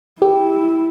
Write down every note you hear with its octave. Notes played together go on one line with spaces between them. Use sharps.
E4 G4